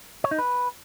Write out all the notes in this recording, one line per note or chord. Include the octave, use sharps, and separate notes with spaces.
C#5
D#4
B4